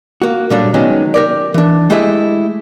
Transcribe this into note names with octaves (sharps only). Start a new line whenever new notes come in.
A#3 F#4
A#2 F#3 G3 A3 D4
D#3 F#3 G#3 B3 C#4
G4 A#4 D5
E3 D4
G#3 A3 E4 G4 G#4 E5